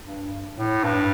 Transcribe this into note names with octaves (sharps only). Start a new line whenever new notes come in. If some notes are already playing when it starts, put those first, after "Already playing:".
G2
A2
G2